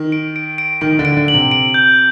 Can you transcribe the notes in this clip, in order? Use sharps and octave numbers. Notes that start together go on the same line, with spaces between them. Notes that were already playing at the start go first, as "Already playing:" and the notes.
Already playing: D#3
D7
D7
D7
D#3 D7
D3
D7
D3
F#7
C3
D7
G6